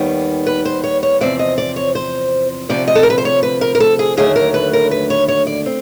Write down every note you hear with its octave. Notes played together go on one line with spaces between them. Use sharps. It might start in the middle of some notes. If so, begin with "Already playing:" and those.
Already playing: D#2 D#3 G3 B3
B4
C5
C#5
C#5
E2 C3 F3 C4 D5
D#5
D5
C#5
C5
D2 C3 F3 D5
D#5
A4
A#4
B4
C5
C#5
B4
A#4
A#4
A4
G#4
D#2 D3 F#3 A3 G#4
A#4
B4
A#4
B4
C#5
C#5
D5
C4